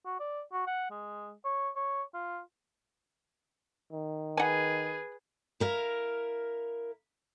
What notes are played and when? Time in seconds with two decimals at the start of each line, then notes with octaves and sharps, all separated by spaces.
0.05 F#4
0.20 D5
0.53 F#4
0.67 F#5
0.90 G#3
1.45 C#5
1.76 C#5
2.14 F4
3.92 D#3
4.37 G#4 B4 F#5 G#5
5.60 E4 A#4 F5